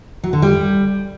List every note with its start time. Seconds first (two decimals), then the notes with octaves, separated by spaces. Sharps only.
0.24 F#3
0.33 D3
0.42 G3